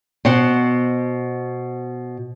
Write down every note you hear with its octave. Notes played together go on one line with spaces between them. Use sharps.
B2 C5 F#5